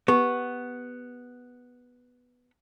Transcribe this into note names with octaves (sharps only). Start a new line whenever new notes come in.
B3 G4